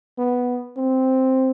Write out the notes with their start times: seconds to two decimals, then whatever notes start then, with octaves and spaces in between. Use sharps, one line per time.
0.18 B3
0.77 C4